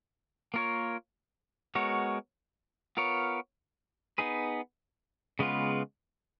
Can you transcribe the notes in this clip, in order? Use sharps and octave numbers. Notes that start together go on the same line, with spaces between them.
A#3 F4 A#4 C#5
G#3 B3 F#4 A#4 C#5
B3 F4 A#4 C#5
B3 D#4 G#4 B4
C#3 G#3 B3 F4 B4